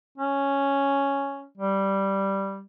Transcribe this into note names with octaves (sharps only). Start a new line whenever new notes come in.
C#4
G3